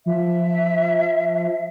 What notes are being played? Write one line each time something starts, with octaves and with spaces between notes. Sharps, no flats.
F3 E5